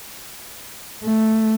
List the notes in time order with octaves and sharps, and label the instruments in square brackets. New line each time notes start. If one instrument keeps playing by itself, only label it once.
[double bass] A3